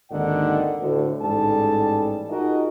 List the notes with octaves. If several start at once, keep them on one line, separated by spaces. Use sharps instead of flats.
G#1 D#2 D3 D#3 F#5
D2 A2 D3
A1 G#2 G3 G#4 A4 A5
D#4 F4 F#4 G#4 A#4 D#5